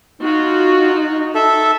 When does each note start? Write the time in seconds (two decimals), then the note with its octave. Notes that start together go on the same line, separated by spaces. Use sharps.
0.22 D#4 F4 F#4
1.35 A4 E5